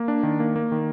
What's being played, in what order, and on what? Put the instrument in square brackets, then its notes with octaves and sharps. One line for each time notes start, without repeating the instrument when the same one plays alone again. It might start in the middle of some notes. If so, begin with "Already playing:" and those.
Already playing: [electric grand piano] A#3
D4
D#3
A#3
A#3
D#3